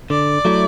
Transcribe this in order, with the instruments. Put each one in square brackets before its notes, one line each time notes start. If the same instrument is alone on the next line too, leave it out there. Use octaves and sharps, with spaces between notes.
[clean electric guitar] D3 [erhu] D5
[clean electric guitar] F#3 A3 E4